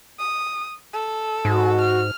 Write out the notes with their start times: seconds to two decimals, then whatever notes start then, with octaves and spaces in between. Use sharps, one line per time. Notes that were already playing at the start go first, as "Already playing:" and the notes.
0.20 D#6
0.94 A4
1.45 G#2 F#4
1.82 F6